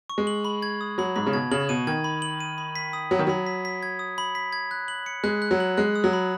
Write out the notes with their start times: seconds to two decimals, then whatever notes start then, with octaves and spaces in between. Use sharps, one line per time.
0.10 C#6
0.18 G#3
0.27 F#7
0.45 B5
0.63 G#6
0.81 D#6
0.98 F#3 B5
1.16 G#2 B5
1.26 C#3
1.33 B2 G#6
1.51 C#3 F#7
1.69 B2 D#7
1.87 D#3 G#6
2.04 B5
2.22 F#7
2.41 D#7
2.58 B5
2.76 B6
2.93 D#6
3.11 F#3 B5
3.19 D#3
3.27 F#3 B5
3.47 B6
3.65 B6
3.83 G#6
3.99 D#6
4.18 B5
4.35 B6
4.53 G#6
4.71 F#6
4.88 F#7
5.06 C#7
5.24 G#3 F#6
5.42 F#6
5.51 F#3
5.60 F#7
5.77 G#3 F#6
5.95 D#6
6.04 F#3
6.13 B5